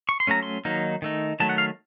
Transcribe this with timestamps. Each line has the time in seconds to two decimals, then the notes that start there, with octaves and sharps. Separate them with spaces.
0.09 C#6
0.20 C6
0.27 F#3 A3 C#4 A#5
0.43 C6
0.65 D#3 F#3 A#3 D#4
1.02 D#3 A3 D#4
1.40 D#3 F#3 A3 A5
1.49 F#5
1.58 F5